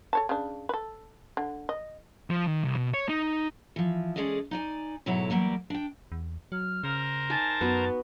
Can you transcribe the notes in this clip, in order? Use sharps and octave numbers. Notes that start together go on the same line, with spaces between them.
A4 C#5 A5
C#3 D4
A4 B4
D3
D#5
F3
D#3
C2
B2
C#5
D#4
E3 F3
G#3 C#4 G#4 A4 D5 D#5
D#4 D5 G#5
G#2 B2 F#3 E4 A4 C#5
E3 F#3 G3 A#3 D5
D4 G5
E2
F#3 F6
C#3 A#4 C5 A#5
D#4 G#5 A5 D6
F#2 B3 F#4